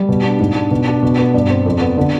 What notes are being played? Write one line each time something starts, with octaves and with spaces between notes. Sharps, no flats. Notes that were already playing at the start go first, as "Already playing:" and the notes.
Already playing: G3
B2
D4
G#2
D4
B2
D4
B2
B3
G2
C4
F2
B3
D3